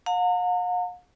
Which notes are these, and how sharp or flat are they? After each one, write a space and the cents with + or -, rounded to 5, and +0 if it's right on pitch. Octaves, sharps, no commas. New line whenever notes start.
F5 +45 A#5 -40